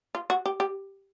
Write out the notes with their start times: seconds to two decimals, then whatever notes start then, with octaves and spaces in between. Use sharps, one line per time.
0.15 F4
0.30 F#4
0.46 G4
0.60 G4